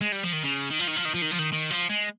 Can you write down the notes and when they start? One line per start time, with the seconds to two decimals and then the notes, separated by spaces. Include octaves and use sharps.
0.01 G#3
0.12 G3
0.23 F3
0.33 D#3
0.43 C#3
0.70 D#3
0.79 F3
0.87 D#3
0.96 F3
1.05 D#3
1.14 F3
1.22 D#3
1.31 F3
1.39 D#3
1.53 D#3
1.70 F3
1.89 G#3